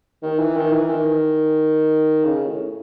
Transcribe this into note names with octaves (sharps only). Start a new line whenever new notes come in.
D#3
E3
D#3
E3
D#3
C#3
A2